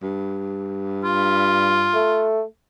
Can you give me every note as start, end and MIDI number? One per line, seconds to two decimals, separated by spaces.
0.02 2.04 43
1.04 2.27 65
1.94 2.42 57